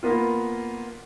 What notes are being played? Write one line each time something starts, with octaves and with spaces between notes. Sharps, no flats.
A#3 B3 F4